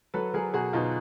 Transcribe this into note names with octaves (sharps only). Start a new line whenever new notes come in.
F#3 A4 B4
F#3 G#4 A#4
B2 F#4 G#4
B2 D#4 F4